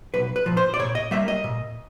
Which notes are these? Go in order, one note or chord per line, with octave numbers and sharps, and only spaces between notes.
B1 B4
B4
A#2 F3
C5
D5
A#2 C#5
D#5
G3 A#3 E5
D#5
A#2